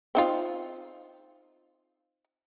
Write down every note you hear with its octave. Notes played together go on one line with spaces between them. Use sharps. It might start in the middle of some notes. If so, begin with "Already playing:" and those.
C4 D#4 F4